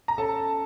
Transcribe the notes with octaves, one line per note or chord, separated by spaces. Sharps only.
A#5
C#4 A4 A5